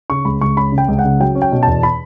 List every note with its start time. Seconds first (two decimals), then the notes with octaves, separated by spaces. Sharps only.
0.10 C#3 C#6
0.25 C#2 B5
0.41 C#2 C#6
0.57 C#4 B5
0.72 C#3
0.78 G5
0.88 C#2
0.99 F#5
1.04 C#3
1.20 F#3 G5
1.35 C#4
1.42 G5
1.52 B2
1.63 E2 A5
1.83 B5